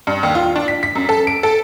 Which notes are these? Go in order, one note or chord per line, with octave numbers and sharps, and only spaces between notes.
G2
D#2
F4
D4
B6
B6
F#2
A4
D7
A4